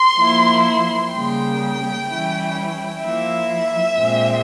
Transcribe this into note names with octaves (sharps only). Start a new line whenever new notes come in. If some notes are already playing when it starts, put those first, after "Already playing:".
Already playing: C6
F3 A#3 E4
C#3 G3 A#3 G5
E3 G3 C#4 E4
F3 A#3 E4 E5
A#2 G#3 C4